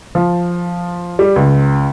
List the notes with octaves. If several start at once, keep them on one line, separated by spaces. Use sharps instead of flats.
F3
G3
C#2